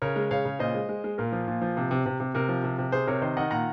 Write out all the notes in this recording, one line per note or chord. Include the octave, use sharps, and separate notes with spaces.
C#3 A#4 C#5
G#3
C#3 C#5 F5
C#3
A#2 C5 D#5
G#3
G#3
G#3
A#2 A#4
F3
A#2
F3
C3
C3
C3
C3
C3 A#4
F3
C3
C3
C3 G#4 C5
C3 A#4 C#5
D#3 C5 D#5
D#3 D#5 F#5
A#2 F#5 A#5